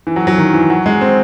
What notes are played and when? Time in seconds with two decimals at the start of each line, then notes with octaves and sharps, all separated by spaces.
0.07 E3
0.16 F#3
0.27 F#3
0.38 D#3
0.54 E3
0.70 F#3
0.86 G#3
1.01 C4